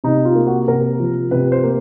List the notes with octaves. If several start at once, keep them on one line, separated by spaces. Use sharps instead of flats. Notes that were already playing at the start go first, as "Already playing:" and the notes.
C3 D#4
F4
A#3
F#4
C3 A#4
F3
C3 B4
C5
A#3